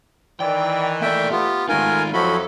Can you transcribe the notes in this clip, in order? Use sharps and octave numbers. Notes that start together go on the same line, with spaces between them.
D#3 E3 D5 G5
A3 A#3 D5 E5 G5
B3 F4 G4
D#3 G#3 A3 B3 D#4 F4 A#4 G#5
F2 F3 F#3 E4 F#4 A4 B5